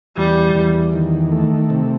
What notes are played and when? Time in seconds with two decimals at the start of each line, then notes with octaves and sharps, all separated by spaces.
0.17 E2 G3
0.55 E2
0.93 D#3
1.32 A3
1.70 C3